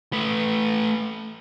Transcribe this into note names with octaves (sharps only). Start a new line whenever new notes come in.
A3 B4